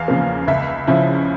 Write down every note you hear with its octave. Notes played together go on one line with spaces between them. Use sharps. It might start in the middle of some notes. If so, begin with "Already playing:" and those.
Already playing: E2 F5
C#3 F3 A#3
C#2 E5
C#3 F3 C#4 E4